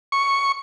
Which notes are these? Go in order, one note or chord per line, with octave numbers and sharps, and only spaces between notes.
C#6